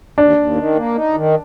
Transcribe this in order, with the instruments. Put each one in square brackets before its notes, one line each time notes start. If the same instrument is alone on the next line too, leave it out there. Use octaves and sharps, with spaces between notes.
[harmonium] D#2 [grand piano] D4
[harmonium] D#2
D#3
A#3
D#4
D#3